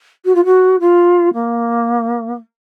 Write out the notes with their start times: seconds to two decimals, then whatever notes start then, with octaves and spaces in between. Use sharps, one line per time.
0.25 F#4
0.35 F4
0.45 F#4
0.80 F4
1.34 A#3